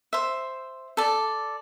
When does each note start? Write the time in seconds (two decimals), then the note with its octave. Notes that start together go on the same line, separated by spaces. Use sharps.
0.13 C5 E5
0.97 A4 D5